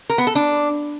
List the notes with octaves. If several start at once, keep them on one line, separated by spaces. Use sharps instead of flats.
A#4
B3
A4
D4